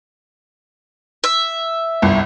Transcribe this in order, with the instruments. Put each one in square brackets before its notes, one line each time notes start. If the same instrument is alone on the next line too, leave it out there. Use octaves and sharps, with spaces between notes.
[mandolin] E5
[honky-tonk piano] G1 C2